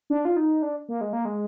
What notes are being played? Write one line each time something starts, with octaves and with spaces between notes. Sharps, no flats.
D4
F4
D#4
D4
A#3
G#3
A#3
G#3